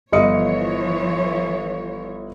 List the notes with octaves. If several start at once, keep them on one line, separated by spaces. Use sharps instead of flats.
G1 E3 F3 C#5 D#5 C#7